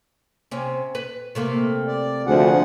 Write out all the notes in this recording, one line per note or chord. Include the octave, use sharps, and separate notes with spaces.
C3 C#4
B4
C3 A3 A#3
D5
D2 F3 G#4 C5 F#5